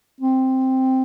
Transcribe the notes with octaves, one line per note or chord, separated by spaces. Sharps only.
C4